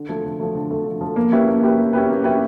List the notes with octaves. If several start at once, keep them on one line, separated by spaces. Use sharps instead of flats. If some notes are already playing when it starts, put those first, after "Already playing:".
Already playing: D3
F3 A3
D3
F3 A3
D3
F3 A3
D3
F3 A3
A#3
C#4 E4 G4 B4
A#3
C#4 E4 G4 B4
A#3
C#4 E4 G4 B4
A#3
C#4 E4 G4 B4